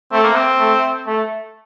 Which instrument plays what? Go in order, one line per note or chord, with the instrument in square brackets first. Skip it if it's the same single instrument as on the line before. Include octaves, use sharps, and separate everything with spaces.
[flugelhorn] A3 [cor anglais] C4
[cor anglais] A#3
C4
[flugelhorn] A3
A3